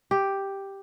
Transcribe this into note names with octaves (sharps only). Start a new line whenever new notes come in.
G4